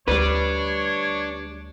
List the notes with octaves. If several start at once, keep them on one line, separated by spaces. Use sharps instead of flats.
D2 D3 G3 D4 B4 C#5